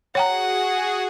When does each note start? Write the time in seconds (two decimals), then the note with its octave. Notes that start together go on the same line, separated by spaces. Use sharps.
0.15 F#4 G#4 C#5 F#5 G5 A#5